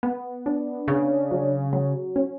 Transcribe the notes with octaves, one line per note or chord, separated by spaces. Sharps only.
B3
D4
C#3
F#3
F#3
C#4